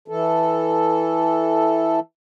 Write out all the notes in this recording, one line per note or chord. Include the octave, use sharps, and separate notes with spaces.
E3 A4